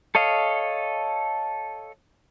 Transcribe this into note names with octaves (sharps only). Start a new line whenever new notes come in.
A4 C#5 D#5 F5